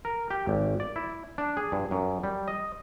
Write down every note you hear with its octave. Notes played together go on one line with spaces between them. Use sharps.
A#4
G4
G#1
D5
E4
D4
G#4
G2
F#2
G3
D#5